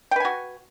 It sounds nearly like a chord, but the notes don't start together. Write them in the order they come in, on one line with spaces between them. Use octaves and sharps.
G5 B4 G#5 F#4